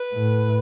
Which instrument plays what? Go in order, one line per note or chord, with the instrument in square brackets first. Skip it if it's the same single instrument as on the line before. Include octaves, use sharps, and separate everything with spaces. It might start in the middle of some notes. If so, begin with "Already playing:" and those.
Already playing: [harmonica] B4
[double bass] A2